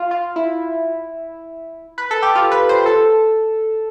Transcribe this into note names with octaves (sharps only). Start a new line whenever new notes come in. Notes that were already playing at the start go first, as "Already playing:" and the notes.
Already playing: F4
F4
E4
B4
A4
G4
F4
B4
C5
A4